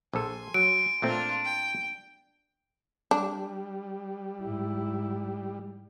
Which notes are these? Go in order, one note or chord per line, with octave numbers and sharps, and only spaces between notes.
A#1 A4 G#5 C6
F#3 D7
A#2 A3 C4 D4 F4
G5
G3 D4
G#2 E4